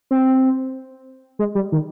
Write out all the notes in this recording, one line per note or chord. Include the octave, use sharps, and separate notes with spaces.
C4
G#3
G3
D#3